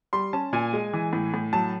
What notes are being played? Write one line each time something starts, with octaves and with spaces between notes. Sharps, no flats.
G3 C6
C#4 A5
A#2 G#5
G#3
E3
A2
A2
F#3 A5